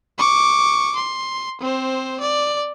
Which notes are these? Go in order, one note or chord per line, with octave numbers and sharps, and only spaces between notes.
C#6 D6
C6
C4 C5
D5